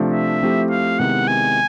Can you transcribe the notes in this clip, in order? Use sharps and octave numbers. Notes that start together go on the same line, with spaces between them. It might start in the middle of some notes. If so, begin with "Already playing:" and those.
Already playing: C3 F3 A3 D4
E5
F3 A3 C4 E4 G4
F5
C3 D#3 G#3 B3 E4 F#5
G#5